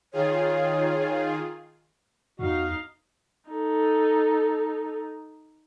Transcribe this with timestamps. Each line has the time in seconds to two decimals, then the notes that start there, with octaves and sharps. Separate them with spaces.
0.13 D#3 F4 G#4 C#5
2.39 E2 D#4 F#4 F5
3.50 D#4 A4